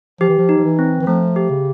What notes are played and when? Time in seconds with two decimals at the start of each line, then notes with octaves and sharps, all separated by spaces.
0.21 F3 G4
0.29 E3
0.38 F3
0.49 D#4
0.58 F3
0.64 E3
0.79 C4
1.00 E3
1.07 F3 A3
1.36 G4
1.50 C#3